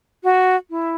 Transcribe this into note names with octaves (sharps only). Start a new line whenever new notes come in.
F#4
E4